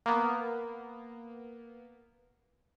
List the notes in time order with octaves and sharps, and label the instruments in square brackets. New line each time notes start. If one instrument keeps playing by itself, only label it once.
[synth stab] A#3 B3